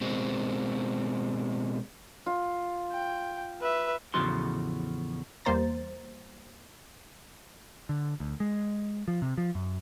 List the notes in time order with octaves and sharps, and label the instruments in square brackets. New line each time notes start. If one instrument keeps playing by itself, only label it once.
[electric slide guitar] B2 G#3 C4
[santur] F4
[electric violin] G5
B4 E5
[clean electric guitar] E2 A2 C#3 F3 F#4 C6
[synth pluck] E2 G3 A#3 C5 A#5 A6
[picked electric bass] D3
D2
G#3
F3
C3
F3
F#2